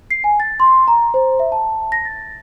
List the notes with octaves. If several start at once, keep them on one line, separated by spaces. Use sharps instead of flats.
C7
G#5
A6
C6
A#5
C5
E5
A5
A#6
A6